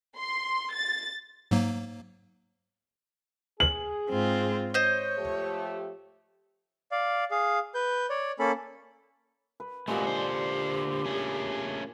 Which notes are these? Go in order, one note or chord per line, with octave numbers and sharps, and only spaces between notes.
C6
A6
G#2 F#3 A#3
G#4 F#7
G#2 C4 F4
C5 C#5 D#5
F3 A3 G4
D5 F5
G#4 F5
B4 G6
C#5 D5
A#3 C#4 A4 B5
B4
A#2 G#3 A3 C4 F#4 G4
D3 D4 C5
A3 C#4 G#4